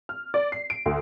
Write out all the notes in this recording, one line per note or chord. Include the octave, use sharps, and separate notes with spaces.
F6
D5
C7
D7
D2